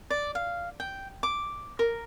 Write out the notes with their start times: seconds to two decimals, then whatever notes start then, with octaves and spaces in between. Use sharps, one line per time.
0.10 D5
0.35 F5
0.80 G5
1.23 D6
1.79 A#4